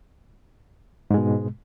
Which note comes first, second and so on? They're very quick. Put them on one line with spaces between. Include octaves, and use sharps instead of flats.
G#2 G#3 B2